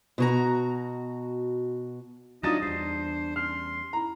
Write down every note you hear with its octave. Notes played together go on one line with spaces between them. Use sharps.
B2 F#4 A#5
F#3 D4 D#4 F4 D#5 D#6 A6 E7
E2 G3 D4 C5
C#4 C6 F6
E4 A#5